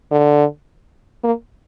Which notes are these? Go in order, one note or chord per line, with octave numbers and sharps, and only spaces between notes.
D3
A#3